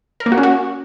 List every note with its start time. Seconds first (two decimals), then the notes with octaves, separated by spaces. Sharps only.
0.20 A#4
0.26 A#3
0.32 F#4
0.38 C#4
0.43 F#4